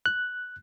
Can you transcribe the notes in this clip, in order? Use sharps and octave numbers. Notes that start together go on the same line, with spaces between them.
F#6